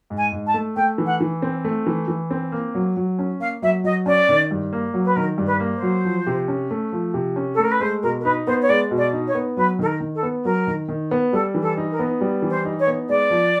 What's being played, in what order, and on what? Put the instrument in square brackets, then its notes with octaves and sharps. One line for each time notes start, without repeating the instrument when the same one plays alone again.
[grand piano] G#2
[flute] G#5
[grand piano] G#2
[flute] A5
[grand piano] A3
[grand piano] A3 [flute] G5
[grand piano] E3
[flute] F#5
[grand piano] E3
C4
A3
E3
E3
C4
A#3
F#3
F#3
C#4
[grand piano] A#3 [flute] F5
[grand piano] F#3 [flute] E5
[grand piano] F#3 [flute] D#5
[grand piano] C#4 [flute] D5
[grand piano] D#3
G2
A#3
F#3
[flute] B4
[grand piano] D#3 [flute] A#4
[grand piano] G2
[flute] B4
[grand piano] A#3
[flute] C5
[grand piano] F#3
F3
C3
C#4
A3
F3
C3
C#4
[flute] A4
[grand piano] A3 [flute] A#4
[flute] B4
[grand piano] G#3 [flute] C5
[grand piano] B2 [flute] A#4
[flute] A#4
[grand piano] D#4 [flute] B4
[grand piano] B3 [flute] C5
[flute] C#5
[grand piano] G#3 [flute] D5
[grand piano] B2
[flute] D5
[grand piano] D#4
[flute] C#5
[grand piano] B3
[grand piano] F#3 [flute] B4
[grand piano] D#3 [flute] A4
[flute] A#4
[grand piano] D#3
[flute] A4
[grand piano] B3
[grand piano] F#3 [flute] A#4
[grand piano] D#3
D#3
B3
[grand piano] G3 [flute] A4
[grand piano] E3
[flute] A4
[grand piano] D#4
[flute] A#4
[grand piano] B3
G3
E3
[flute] C5
[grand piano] D#4
[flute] C#5
[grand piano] B3
[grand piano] G#3 [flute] D5
[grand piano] F3